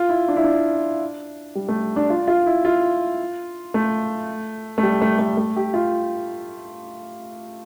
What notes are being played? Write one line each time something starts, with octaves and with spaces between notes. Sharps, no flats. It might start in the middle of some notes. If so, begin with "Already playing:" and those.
Already playing: F4
E4
D4
E4
D4
G3
A3
D4
F4
F4
E4
F4
A3
A3
G3
A3
A3
A3
G4
F4